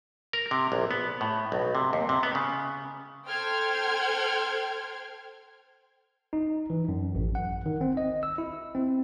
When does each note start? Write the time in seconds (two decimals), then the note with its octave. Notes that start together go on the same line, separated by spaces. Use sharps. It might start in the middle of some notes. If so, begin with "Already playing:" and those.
0.33 A#4
0.51 C3
0.72 A#1
0.91 B3
1.21 A2
1.52 B1
1.75 C3
1.93 D#2
2.09 C3
2.23 B3
2.35 C#3
3.27 A4 C5 G5 C6 F6 G#6
6.33 D#4
6.70 E3
6.88 F#2
7.15 A1
7.35 F#5
7.66 D#3
7.81 C4
7.97 D#5
8.23 E6
8.38 E4
8.75 C4